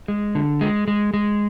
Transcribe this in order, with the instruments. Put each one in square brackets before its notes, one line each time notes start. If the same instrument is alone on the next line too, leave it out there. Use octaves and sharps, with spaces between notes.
[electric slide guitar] G#3
D3
G#3
G#3
G#3